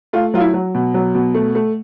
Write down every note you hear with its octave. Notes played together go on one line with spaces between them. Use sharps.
A3 F4
F#3 F4
E4
F#3
B2
F#3
B2
A3
A3